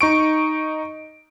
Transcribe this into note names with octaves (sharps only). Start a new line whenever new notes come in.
D#4 C#6 D7